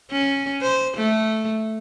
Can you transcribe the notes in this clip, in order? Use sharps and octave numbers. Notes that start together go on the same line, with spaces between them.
C#4
C5
A3